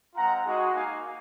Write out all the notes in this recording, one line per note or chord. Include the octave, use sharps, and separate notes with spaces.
G#3 C4 F4 F#5 A#5
G#3 D#4 F#4
A#3 D#4 F#4 F5 G#5